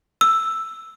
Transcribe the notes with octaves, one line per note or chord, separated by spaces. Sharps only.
E6